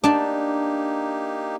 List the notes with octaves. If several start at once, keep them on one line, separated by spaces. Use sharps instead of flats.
A#3 D4 D#4 G4 A5